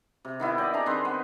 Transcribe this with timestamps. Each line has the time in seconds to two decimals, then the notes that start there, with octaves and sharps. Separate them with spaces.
0.25 C3
0.40 D#3 B3 E4
0.58 D5 D#5 G5
0.73 D4 G#4 G#5 A#5
0.86 D#3 C4 B4 C5
1.05 B3